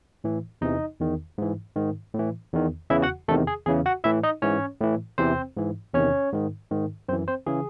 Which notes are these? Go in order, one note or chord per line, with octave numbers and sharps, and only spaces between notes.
A2 E3
E2 C3 E3 D#4 D#5
E2 D#3
G#2 E3
G#2 D#3
A2 E3
E2 D#3
E2 C#3 E3 E4 E5
F#4 F#5
E2 C3 D#3 A3 A4
G#4
E2 C#3 E3 G#4
F#4 F#5
A2 E3 E4 E5
D#4 D#5
G#2 E3 C#4 C#5
A2 E3
E2 C3 E3 C4 C5
G#2 E3
E2 C3 D#3 C#4 C#5
G#2 D#3
G#2 D#3
F#2 E3 C4 C5
C4 C5
C#3 E3 G#4